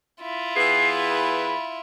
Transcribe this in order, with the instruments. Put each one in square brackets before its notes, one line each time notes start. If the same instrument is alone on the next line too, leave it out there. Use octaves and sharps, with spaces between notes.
[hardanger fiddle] E4 F4
[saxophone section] E3 B3 G#4 [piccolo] C7
[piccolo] B5